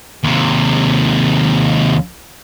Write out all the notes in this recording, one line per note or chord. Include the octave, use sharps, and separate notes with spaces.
D#2 C3